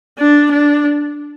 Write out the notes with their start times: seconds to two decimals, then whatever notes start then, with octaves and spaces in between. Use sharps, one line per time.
0.19 D4
0.51 D4